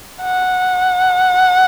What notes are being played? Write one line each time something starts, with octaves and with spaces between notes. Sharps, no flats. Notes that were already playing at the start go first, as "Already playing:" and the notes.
F#5